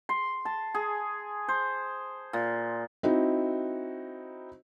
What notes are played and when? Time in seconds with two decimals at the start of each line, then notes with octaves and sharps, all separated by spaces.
0.09 C6
0.45 A5
0.75 G#4
1.48 C5
2.33 A#2
3.03 C4 D#4 E4 F#4